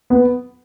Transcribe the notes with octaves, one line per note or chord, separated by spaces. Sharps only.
B3